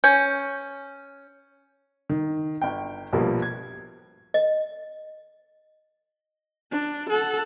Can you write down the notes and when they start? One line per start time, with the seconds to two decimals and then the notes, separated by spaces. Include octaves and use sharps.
0.04 C#4 G6
2.10 D#3
2.62 G1 G5
3.13 A#1 B2 F3 G3 A#3
3.42 G#6
4.34 D#5
6.71 D4
7.10 A4 F#5